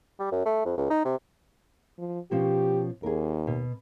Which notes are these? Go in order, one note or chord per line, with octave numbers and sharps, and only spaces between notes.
G3
F#2
A3
F2
C#2
D#4
C3
F3
B2 F3 C#4 G4
D#2 G#4 A#4
B2